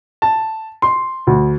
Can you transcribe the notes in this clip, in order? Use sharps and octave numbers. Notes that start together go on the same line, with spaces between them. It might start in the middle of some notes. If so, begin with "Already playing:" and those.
A5
C6
D2